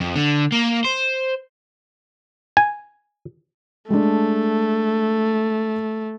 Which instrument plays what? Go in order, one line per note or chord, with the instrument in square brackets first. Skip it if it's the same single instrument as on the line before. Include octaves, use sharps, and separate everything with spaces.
[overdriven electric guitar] F2
D3
A#3
C5
[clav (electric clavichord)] G#5
[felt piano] G#3 D4 [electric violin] A3